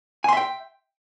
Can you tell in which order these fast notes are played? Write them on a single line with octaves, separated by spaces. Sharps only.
G#5 C6 E5 G5